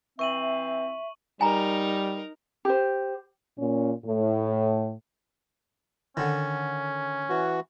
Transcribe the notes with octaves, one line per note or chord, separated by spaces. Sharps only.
E3 C4 E5 C#6 D#7 F#7
E5
G3 D#4 A#4 G#5 A#5
G4 C5
A#2 C#4
A2
D3 D#3 C#4
E3 F#4